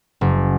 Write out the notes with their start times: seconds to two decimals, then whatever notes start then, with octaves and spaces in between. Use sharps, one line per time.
0.21 F#1